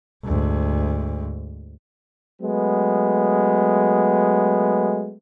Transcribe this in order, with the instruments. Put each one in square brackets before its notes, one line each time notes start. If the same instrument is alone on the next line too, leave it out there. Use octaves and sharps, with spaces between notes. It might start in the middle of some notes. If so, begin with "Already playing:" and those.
[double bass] D2 G#2
[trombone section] F#3 G#3 A3 B3